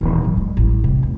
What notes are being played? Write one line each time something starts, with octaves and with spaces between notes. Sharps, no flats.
D#1 E3
G#2 F#3
G#3
A1 G3
C3 G3
F1